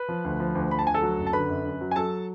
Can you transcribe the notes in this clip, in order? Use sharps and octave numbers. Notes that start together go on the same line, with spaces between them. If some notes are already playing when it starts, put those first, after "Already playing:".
Already playing: B4 B5
F3
D2
F3
D2
F3 B5
A5
D2 G#5
A4 A5
F#3
F#1
A5
D3 B4 B5
F#2
F#2
F#3
G#5
F#3 A4 A5